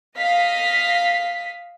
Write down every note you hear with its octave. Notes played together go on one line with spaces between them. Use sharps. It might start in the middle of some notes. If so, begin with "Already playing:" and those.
D#5 F5 B6